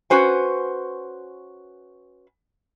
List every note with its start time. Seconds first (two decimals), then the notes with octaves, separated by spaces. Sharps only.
0.10 C#4 F#4 B4 C5 G#5